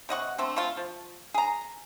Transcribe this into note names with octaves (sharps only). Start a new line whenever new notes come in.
C3 D#5 F#5 C#6
D3 A3 C4
A3 C4 F4
F3
G#4 A#5